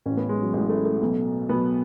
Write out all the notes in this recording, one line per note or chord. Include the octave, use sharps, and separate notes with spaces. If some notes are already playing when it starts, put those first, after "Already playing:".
A1 A2 C#4
B3
G#3
F#3
A1 A2 G#3
A3
A3
B1 B2
B1 B2 B3